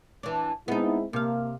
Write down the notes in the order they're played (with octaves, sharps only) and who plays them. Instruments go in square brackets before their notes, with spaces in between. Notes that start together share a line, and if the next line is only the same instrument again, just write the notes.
[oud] E3 D4
[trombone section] G#3 C4 E4 [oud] B3 D#4
[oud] C3 F5 [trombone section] A#3